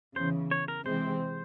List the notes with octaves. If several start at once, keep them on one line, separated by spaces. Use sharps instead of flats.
E2 C#3 E3 C5
C#5
A#4
C3 E3 G#3 C4 C5